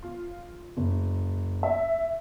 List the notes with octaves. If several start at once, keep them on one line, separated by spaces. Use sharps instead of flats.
F4
F#1
E5